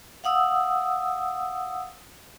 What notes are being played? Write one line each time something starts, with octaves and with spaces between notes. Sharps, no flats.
F5 F#5 D#6 E6